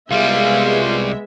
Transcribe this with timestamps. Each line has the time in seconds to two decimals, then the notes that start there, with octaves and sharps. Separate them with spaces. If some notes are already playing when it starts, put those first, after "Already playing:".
0.11 C2 G3 G#3 B3 F4 E5